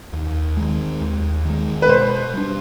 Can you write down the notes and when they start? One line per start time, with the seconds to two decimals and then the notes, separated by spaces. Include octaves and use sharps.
0.13 D#2
0.57 D#3 G#3
1.01 D#2
1.45 D#3 G#3
1.82 B4
1.89 B2 C5
2.34 G3 D4